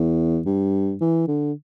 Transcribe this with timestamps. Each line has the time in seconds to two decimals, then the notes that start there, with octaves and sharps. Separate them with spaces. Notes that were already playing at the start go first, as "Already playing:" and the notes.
Already playing: E2
0.46 G2
1.01 E3
1.28 D3